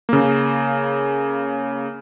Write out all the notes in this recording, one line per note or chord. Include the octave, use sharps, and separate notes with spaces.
C#3 A#3